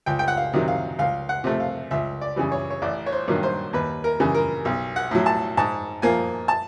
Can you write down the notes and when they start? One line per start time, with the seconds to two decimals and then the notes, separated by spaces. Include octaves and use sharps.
0.06 C#2 G5
0.19 G5
0.28 F#5
0.37 F5
0.53 C3 D#3 F#3
0.68 F5
0.99 C#2 F5
1.29 F#5
1.44 C3 F3 A3
1.60 F5
1.91 C#2 E5
2.21 D5
2.36 C#3 E3 G3
2.51 C#5
2.70 C#5
2.82 A1 D5
3.06 C#5
3.12 C5
3.28 G2 D#3 F#3 A#3
3.43 C5
3.73 D#2 B4
4.04 A#4
4.20 C#3 E3 G3
4.35 A#4
4.65 B1
4.96 F#5
5.11 A2 F#3
5.26 A5
5.57 G#2 A5
6.02 F3 A#3 G#5
6.48 A5